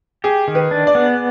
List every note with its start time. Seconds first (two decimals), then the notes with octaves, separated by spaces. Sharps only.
0.24 G4 G#4
0.48 D#3
0.55 B4
0.71 D4
0.87 D5
0.95 B3